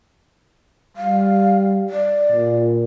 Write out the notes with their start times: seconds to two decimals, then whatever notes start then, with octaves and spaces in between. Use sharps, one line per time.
0.97 G3 F5
1.90 D5
2.32 A#2